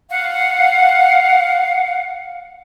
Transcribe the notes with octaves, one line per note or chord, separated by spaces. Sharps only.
F5 F#5